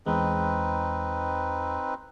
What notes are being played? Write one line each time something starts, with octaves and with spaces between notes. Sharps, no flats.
E2 G#3 C4 D#4 B4